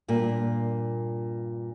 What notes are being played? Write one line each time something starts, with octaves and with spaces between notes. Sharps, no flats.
G2 A#2 A#3